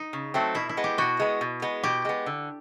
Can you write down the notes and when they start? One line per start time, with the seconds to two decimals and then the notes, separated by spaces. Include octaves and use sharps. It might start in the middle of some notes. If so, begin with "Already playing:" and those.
Already playing: D#4
0.13 C#3
0.34 F#3 A3 C4
0.55 B2 E4
0.69 E4
0.77 G#3 B3
0.84 G4
0.98 B2 F#4
1.20 G#3 B3
1.41 B2
1.62 G#3 B3
1.83 B2 G4
2.05 G#3 B3
2.26 D3